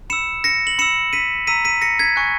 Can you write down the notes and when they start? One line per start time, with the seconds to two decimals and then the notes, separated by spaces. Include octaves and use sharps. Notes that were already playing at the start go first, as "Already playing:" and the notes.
0.10 B5 E6 C#7 E7
0.44 A#6 C#7
0.67 F#7
0.78 B5 E6 C#7 E7
1.13 B6 D#7
1.47 A#5 E6 B6 D#7
1.65 B6 D#7
1.81 A#6 C#7
1.99 G#6 B6
2.16 G#5 C#6 F#6